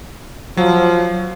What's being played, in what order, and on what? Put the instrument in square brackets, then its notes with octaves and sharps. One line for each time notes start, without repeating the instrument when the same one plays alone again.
[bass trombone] F3 [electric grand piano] F#3